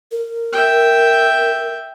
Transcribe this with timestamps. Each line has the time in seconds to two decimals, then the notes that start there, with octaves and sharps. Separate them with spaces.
0.12 A#4
0.53 E5 G5